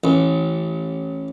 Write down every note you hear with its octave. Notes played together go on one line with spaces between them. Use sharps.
A1